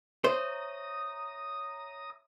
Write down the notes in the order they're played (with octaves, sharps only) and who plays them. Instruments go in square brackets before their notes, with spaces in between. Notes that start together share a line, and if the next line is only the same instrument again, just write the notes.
[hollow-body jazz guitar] C5 [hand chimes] C#5 E5 [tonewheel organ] A#5 D#6